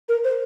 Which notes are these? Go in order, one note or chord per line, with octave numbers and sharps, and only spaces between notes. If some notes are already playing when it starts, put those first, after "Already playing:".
A#4
C5